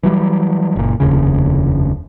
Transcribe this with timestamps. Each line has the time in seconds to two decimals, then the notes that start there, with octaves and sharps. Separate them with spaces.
0.03 E3 F#3 G3
0.76 F#1 A#2
1.00 F1 D#2 C#3